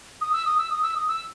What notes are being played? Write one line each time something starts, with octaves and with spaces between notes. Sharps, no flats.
D#6
E6
D#6
E6
D#6
E6
D#6
E6